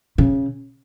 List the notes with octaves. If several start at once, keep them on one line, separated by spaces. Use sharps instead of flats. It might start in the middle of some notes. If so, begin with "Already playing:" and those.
C#3